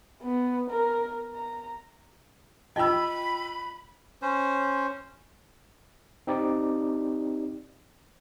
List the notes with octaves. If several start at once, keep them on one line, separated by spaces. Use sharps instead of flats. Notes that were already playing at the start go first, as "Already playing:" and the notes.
B3
A#4
A#5
F4 D#5 G5 B5 E6
C#4 C5
C4 D#4 G4 D5